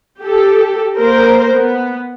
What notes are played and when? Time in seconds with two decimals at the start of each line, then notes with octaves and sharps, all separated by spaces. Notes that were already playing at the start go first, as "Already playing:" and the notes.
0.19 G4 A4
0.96 A#3 A#4 C5
1.54 B3